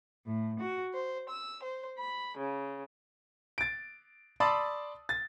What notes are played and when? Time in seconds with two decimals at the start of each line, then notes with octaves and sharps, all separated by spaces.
0.27 A2
0.60 F#4
0.93 C5
1.30 E6
1.63 C5
2.00 B5
2.38 C#3
3.58 A6 D7
4.40 D5 A5 B5 C6 D#6 E6
5.09 A6